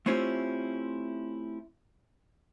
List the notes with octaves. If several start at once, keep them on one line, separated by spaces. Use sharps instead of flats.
A3 C4 C#4 E4 F4 G4